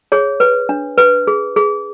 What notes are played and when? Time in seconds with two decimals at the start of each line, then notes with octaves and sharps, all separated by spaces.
0.12 G#4 C#5
0.40 B4
0.69 D4
0.98 B4
1.27 G#4
1.56 G#4